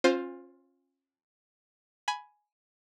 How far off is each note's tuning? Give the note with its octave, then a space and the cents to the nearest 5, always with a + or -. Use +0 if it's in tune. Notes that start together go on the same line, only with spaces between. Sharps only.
C#4 -35 F4 +15 C5 +0
G#5 +10 B5 +0